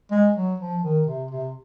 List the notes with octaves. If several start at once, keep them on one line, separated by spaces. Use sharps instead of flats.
G#3
F#3
F3
D#3
C3
C3